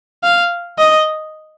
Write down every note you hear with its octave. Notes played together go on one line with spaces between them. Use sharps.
F5
D#5